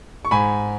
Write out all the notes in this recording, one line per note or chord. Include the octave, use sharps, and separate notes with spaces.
C#6
G#2 G#5 B5